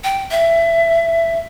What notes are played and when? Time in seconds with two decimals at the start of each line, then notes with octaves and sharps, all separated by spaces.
0.04 G5
0.31 E5